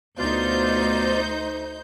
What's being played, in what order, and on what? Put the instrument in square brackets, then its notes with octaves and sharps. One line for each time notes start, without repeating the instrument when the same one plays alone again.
[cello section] D2 [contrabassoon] B2 [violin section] D#4 C5 G6 [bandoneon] F4 D5 F5